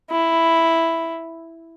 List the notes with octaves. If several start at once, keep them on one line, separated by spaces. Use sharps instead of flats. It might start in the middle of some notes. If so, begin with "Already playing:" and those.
E4